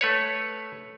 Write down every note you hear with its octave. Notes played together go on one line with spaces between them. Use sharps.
A3 B4 C#5